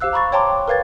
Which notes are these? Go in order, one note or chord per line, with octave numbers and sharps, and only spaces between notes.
G4 C5 F5 E6 F#6
A#5 B5 C#6 A6
C#5 G5 A5 A#5 C6 D6
A#4 B4 F5 G#6 A6